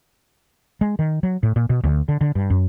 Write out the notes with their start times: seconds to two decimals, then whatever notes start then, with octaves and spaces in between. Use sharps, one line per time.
0.81 G#3
0.99 D#3
1.23 F#3
1.43 A2
1.56 A#2
1.70 B2
1.84 D2
2.08 D3
2.21 D3
2.35 G2
2.50 F#2